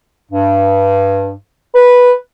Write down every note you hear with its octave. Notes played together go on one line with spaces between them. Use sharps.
G2
B4